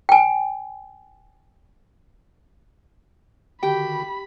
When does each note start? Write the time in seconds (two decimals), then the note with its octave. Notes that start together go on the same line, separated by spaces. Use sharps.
0.09 G5 G#5
3.63 D3 D#3 F#4 G4 G5 B5